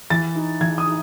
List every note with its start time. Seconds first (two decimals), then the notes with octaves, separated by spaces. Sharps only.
0.10 E3 A6
0.35 D#4
0.61 E3 G#6
0.78 D#6
0.87 D#4